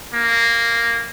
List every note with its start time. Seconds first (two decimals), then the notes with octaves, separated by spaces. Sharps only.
0.14 A#3